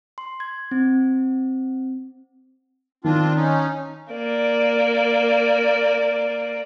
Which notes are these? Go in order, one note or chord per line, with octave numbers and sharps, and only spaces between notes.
C6
G#6
C4
D#3 C4 D4 F4
C#4 D#4
A#3 D5